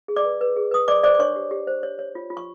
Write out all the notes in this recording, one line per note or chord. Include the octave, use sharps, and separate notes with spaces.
G#4
D5 D6
B4
B4
G#4
B4 D#6
C5 D5 D6
C5 D5 D6
D6
D4 C#5 C#6
G4
G4
C5
C#5
C#5
F4
F4
C#6